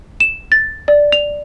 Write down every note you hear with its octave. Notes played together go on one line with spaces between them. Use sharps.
E7
A6
D5
F7